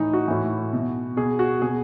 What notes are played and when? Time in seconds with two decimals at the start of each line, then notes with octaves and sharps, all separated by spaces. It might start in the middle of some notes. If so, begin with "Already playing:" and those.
Already playing: A2 E3 D#4
0.13 F#4
0.28 A2 E3
0.73 B2
1.17 B2 G#4
1.39 F#4
1.62 B2 G#4